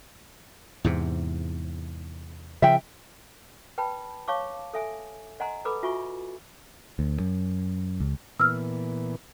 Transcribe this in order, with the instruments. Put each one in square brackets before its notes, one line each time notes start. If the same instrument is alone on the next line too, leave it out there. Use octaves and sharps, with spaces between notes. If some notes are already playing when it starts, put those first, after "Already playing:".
[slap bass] E2 G#2 C3
[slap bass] C#3 F3 [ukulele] E5 G5
[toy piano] B4 G5 A5 B5
C#5 F5 A5 C#6 D6
A4 E5 G#5
D#5 F#5 G#5 A#5 C6
A4 B4 B5 D6
F4 F#4 E5 G#5 C#6
[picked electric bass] D2
F#2
C#2
[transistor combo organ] A#2 E3 B3 [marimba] E6 F6